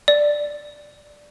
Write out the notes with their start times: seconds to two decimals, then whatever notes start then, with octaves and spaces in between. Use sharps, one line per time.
0.08 D5